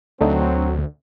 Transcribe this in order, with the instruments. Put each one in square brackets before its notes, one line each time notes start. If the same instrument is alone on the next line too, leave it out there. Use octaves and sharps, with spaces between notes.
[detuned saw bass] D2 [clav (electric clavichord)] D3 A3 D#4 [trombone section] F#3 C4